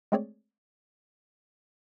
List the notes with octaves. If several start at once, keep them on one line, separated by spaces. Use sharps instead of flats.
G#3 A3 C4 G#4 C#5 D5